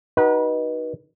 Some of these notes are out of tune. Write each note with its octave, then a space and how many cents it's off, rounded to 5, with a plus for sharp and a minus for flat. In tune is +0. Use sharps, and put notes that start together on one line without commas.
D#4 +0 F#4 +30 B4 -30